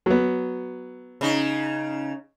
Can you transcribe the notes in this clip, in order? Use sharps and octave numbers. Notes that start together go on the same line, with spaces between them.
F#3 B3
C#3 D#4